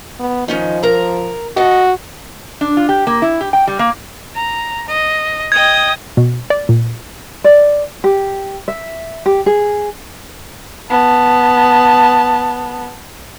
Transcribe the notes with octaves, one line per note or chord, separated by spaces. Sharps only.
B3
D#3 F3 C#4 D#4
A#4 A#5
F#4 A4 D#5
D4
F4
G4
A#3
E4
G4
G5
G3
A#3
A#5
D#5
D#5 G5 D#6 G#6
B2
D5
A#2
D5
G4
E5
G4
G#4
B3 A5